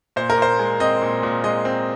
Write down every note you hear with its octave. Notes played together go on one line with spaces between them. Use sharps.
A#2 C5
A#4
A#2 C5
G#3
C4 D#5
A#2
A#2
G#3 D#5
C4